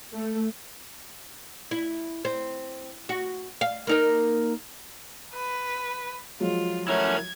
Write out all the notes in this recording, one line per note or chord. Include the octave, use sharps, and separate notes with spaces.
A3
E4
C4
F#4
F5
A#3 D#4 A#4
B4
F3 F#3 G#3 F4
A3 C#4 E4 A#4 F#5 G#6